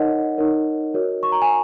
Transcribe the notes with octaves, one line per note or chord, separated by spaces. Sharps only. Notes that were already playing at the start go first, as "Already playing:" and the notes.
Already playing: D#4 A#4 C#5 D#5 F#5
D#4 A#4 C#5
F#4 A#4 C#5
C#6
A#5
G#5